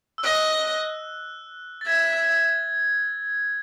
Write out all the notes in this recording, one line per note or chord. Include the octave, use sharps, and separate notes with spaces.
E6
D#5 F#6
A6
E5 G#6